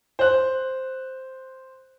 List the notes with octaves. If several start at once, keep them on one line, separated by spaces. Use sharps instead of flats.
C5 F#6